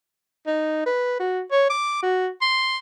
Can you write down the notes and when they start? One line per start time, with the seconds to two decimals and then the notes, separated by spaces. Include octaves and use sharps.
0.47 D#4
0.86 B4
1.19 F#4
1.52 C#5
1.70 D6
2.02 F#4
2.41 C6